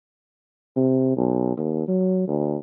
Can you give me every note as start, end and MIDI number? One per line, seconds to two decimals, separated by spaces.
0.76 1.15 48
1.17 1.57 35
1.57 1.87 39
1.88 2.26 54
2.28 2.56 38